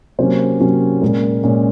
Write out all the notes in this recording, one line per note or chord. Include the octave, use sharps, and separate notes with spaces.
C3 F#3 A#3 C#4 C5
C3 F#3 A#3 C#4 C#5
A#2 G#3 C#4 A#4
A#2 G#3 C#4